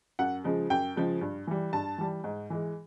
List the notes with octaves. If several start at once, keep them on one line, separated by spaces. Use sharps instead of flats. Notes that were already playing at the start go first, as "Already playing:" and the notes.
F#2 F#5
C#3 F3 G#3
F#2 G5
C#3 F3 G#3
G2
E3 G3
G2 A5
E3 G3
G#2
E3 G#3